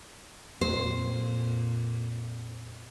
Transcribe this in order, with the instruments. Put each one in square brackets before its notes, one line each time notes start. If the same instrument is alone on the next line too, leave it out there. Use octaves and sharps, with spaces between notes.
[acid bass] F2 [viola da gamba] A#2 [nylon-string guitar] C5